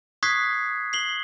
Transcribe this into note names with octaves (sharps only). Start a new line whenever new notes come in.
C#6 D#6 F#6 G#6 B6 C7
C7 F#7 G7